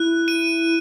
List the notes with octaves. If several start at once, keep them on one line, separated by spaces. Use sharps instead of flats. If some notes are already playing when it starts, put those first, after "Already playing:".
Already playing: E4 F#6
D#7